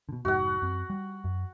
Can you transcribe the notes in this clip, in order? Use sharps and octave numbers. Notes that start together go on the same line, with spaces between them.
B2 D3
F1 G#2 F#4 F#5
F#2 C4
G3
F#2